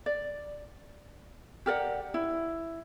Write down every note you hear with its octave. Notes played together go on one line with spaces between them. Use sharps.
D5
G4 A#4 D5 F#5
E4